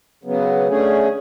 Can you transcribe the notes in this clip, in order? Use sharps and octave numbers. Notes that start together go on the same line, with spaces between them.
C#3 F#3 B3
D3 A3 C#4 G#4